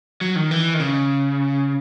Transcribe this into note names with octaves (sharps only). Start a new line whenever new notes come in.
F#3
D#3
E3
D#3
C#3